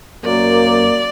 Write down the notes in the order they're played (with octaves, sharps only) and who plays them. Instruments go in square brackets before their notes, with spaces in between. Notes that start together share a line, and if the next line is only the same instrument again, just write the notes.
[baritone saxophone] F#2 [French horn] A#3 [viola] D5